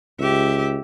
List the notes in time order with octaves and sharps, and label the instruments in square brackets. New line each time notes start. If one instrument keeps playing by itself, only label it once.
[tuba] C#2 [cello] G4 E5